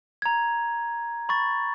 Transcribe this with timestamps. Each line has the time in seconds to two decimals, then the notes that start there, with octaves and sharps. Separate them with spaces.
0.22 A#5 G#6
1.29 B5 C#6 A6